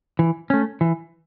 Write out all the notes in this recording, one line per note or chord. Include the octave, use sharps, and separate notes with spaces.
E3
A3 C#4
E3